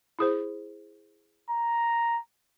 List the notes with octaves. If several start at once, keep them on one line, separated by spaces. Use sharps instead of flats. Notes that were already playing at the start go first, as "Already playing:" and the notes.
E4 G#4 C5
A#5